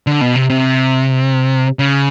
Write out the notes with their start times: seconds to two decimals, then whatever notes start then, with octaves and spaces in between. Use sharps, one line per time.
0.07 D3
0.21 B2
0.35 C3
0.50 C3
1.79 C#3